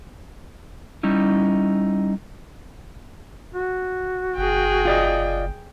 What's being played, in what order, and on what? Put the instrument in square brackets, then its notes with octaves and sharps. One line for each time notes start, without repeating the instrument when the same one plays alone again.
[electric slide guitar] G3 C#4 D#4 E4
[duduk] F#4
[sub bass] F#1 [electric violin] G#4 G5
[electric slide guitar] F4 D5 D#5